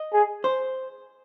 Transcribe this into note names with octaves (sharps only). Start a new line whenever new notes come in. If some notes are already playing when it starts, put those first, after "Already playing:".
Already playing: D#5
G#4
C5